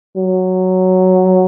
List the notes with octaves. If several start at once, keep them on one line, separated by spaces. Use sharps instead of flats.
F#3